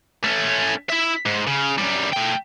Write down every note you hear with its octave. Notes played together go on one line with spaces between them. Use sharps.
A3 C#4
E4 E5
G#2
C#3
F#2 G3
A3 G5